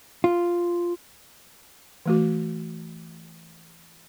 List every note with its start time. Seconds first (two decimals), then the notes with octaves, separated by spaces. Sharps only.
0.24 F4
2.06 E3 A3 F#4